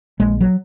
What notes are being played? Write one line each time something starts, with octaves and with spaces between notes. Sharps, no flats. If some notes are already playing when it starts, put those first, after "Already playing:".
A#1 G#3
F#3